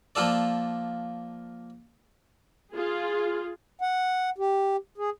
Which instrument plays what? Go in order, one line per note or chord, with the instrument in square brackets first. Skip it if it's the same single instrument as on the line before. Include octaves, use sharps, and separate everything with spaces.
[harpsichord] F3 A#3 F4 A4 D5
[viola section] F4 G#4
[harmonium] F#5
G4
G#4